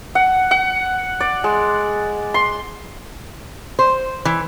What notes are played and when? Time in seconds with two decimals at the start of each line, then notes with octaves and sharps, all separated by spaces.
0.15 F#5
0.51 F#5
1.20 D5
1.44 G#3
2.34 C6
3.79 C5
4.25 E3